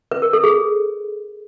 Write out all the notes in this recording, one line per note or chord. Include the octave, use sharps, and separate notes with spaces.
B4
A#4
A4
G#4